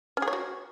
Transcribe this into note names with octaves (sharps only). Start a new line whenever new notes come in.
C#4
G#4
C#5
F#4